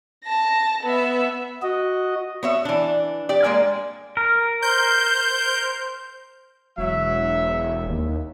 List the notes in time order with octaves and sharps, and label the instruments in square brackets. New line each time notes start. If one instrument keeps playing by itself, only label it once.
[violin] A5 A#6
B3 E5
[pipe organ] F#4 D#5
[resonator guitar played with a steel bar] B3 C#5 E5
E3 D4
G4 D5
G#3 A#3 D5 G#5
[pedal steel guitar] A#4
[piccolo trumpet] C5 [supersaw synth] G6
[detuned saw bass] E1 [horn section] F#3 E5
[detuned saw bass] D#2